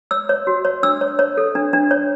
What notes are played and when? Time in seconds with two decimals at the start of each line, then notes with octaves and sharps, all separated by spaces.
0.11 C#5 E6
0.29 C#5
0.47 F#4
0.65 C#5
0.83 D4 E6
1.01 C#5
1.19 C#5
1.37 A4
1.55 D4
1.73 D4
1.91 C#5